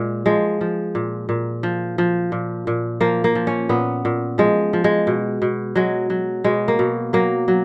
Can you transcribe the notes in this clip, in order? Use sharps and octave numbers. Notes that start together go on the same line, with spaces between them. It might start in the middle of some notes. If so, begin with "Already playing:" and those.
Already playing: A#2 G#3
F3 G#3
F3
A#2
A#2
F3
F3
A#2
A#2
F3 A#3
A#3
F3
C#4
A#2 B3
A#2
F3 G#3
F3
G#3
B2
B2
F#3 G#3
F#3
B2 G#3
A#3
B2
F#3 A#3
F#3